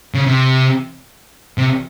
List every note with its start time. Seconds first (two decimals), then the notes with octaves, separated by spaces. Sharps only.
0.14 C#3
0.26 C3
1.58 C3